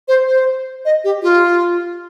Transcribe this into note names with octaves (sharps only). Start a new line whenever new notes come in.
C5
C5
D#5
G4
F4